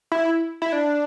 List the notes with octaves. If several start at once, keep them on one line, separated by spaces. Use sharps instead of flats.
E4
E4
D4